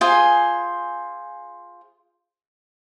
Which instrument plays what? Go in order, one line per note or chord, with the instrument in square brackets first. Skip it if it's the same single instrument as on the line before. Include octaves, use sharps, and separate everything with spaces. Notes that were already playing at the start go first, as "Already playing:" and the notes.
[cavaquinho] F4 G#4 C5 G#5